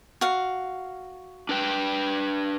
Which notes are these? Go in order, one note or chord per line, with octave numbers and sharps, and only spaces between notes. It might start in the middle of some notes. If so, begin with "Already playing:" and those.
F#4 F5
D4 B4 G5